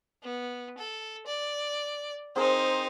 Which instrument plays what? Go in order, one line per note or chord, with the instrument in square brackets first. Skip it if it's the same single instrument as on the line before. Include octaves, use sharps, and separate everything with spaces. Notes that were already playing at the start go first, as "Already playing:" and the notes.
[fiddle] B3
A4
D5
[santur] C4 G#4 A#4 [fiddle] D#4 C5